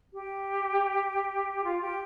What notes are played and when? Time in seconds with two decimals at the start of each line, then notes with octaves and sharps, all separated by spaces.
0.13 G4
1.64 F4
1.82 G4